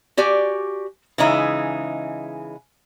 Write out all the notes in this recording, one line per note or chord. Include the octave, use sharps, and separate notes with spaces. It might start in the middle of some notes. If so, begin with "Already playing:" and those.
F#4 G4 D5 G#5
C#3 E3 G#3 D#4 E4 E5